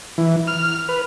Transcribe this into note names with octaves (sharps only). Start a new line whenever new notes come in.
E3
F6
B4